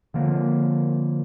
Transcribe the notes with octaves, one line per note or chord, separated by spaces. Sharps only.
D3 F3 A#3